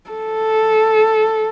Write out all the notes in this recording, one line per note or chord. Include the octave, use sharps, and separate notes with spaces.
A4